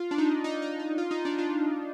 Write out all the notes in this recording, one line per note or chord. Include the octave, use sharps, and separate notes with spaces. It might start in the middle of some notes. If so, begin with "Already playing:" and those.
Already playing: F4
D4
D#4
D#4
D#4
D#4
F4
D#4
D4
F4